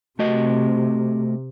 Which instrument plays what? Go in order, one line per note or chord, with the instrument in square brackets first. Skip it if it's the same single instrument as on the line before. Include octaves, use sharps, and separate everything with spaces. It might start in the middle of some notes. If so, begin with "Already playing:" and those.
[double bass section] C3 [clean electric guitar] A3 F#4 D#5